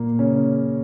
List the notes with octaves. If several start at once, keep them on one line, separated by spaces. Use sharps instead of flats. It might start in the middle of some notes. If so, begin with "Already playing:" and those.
Already playing: A#2 A#3
C#3 C#4